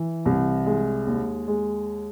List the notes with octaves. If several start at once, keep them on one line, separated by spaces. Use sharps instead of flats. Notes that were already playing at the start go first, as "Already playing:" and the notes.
Already playing: E3
C2
G#3
D#2
G#3